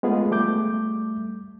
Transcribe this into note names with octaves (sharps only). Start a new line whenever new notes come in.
G#3 A3 B3 F4 G#4
G3 A3 D6 G6